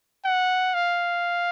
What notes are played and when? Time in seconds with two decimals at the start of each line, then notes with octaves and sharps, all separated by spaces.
0.25 F#5
0.74 F5